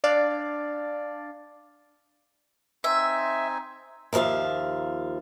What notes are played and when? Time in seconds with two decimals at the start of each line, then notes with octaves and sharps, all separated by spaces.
0.04 D4 D5 F5
2.84 C4 D#4 E5 G#5
4.13 D#2 F3 A4 E5 F5